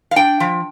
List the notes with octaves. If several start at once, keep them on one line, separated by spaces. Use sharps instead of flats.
F5
D4 G5
F3